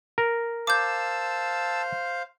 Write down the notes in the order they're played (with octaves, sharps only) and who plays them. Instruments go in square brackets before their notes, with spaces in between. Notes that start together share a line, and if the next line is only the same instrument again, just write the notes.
[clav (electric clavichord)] A#4
[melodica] C5 F5 [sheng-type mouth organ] A5 E6 [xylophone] D6 G6